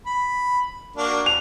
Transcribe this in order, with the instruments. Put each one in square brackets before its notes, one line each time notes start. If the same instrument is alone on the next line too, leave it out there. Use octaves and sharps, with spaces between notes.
[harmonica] B5
A#3 D4 F#4
[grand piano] F7